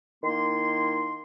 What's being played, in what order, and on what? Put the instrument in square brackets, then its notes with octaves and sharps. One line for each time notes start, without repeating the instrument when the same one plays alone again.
[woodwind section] D#3 A#3 E4 C6